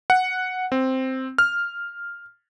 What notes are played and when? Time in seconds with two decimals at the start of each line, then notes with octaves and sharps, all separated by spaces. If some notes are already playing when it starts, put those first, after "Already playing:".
0.10 F#5
0.72 C4
1.38 F6